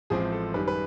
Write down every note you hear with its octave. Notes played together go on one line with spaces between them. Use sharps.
A1 A2 F3 G#3 C4 G#4
A4
F#2 D#3 G3 B4
B4